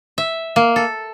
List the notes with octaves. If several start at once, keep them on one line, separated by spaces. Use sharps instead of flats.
E5
A#3
A4